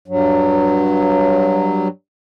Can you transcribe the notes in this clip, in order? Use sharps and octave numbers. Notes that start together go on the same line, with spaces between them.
G2 F#3